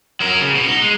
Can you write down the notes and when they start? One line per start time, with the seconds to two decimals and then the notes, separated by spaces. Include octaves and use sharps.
0.20 F#3 A#4
0.40 C#3
0.55 B2
0.67 D#4
0.82 G#3